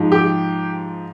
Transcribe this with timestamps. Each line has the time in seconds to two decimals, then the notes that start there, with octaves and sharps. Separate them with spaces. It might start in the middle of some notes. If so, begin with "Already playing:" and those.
Already playing: G#2 F3
0.12 G4